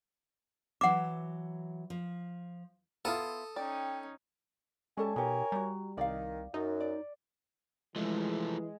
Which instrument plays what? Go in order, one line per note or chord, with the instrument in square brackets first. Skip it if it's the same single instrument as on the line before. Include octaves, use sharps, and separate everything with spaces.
[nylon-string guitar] E3 F#3 E5 [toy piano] F#5 D6
[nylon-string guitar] F3
[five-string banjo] B3 E4 F4 [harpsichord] A4 D#6
[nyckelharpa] C#4 D#4 [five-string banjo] D5 [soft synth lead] G5
[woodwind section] G3 G#5 [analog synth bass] G#3 [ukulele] C#4 A4 A5
[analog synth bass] B2 [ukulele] D#4 G4 [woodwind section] A#4 C#5 G#5
[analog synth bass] G3 [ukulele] F#4 A#5
[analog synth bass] C2 [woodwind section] D#3 [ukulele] D5 F5
[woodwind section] F#2 [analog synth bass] D#4
[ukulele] D5
[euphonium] E3 [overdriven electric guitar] F3 A3 [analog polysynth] G#3